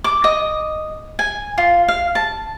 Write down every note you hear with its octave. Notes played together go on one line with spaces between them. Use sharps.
D6
D#5
G#5
F4
F5
A5